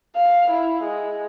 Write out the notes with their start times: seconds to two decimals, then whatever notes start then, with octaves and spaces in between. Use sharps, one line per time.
0.16 F5
0.50 E4
0.83 G#3